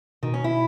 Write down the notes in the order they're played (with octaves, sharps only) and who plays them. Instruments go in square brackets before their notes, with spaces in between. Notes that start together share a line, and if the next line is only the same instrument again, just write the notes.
[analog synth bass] B2 [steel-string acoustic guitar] D#3
[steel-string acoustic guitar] C#4
E4